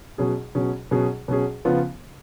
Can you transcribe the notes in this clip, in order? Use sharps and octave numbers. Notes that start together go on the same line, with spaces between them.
B2 F#3 C#4 G#4
B2 F#3 C#4 G#4
B2 F#3 C#4 G#4
B2 F#3 C#4 G#4
C#3 F3 B3 F4